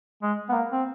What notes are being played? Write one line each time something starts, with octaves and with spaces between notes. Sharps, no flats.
G#3
B3
A#3
C4